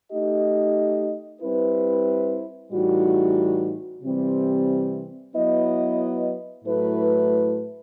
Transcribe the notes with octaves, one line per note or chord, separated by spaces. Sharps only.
A3 D#4 G4 D#5
G3 C4 E4 B4
A2 E3 G3 D#4 F#4
C3 E3 G3 C4
F#3 B3 E4 B4 D#5
A2 F#3 A3 E4 B4